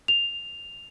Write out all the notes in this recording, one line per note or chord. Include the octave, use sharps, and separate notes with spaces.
F7